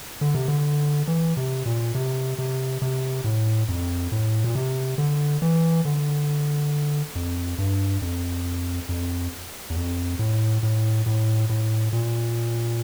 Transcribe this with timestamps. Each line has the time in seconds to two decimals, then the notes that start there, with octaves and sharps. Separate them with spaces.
0.21 D3
0.35 C3
0.48 D3
1.08 E3
1.37 C3
1.66 A#2
1.95 C3
2.38 C3
2.82 C3
3.24 A2
3.69 F2
4.12 A2
4.44 A#2
4.55 C3
4.98 D3
5.42 E3
5.85 D3
7.15 F2
7.58 G2
8.02 F2
8.89 F2
9.70 E2
9.76 F2
10.19 A2
10.63 A2
11.06 A2
11.50 A2
11.93 A#2